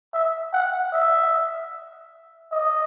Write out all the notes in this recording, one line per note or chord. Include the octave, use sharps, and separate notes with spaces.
E5
F#5
E5
D#5